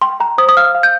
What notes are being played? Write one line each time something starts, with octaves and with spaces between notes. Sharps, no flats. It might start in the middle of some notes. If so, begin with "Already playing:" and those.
G5 C6
G5 A#5
C5 D#6
D#6
F5 F6
F5
G6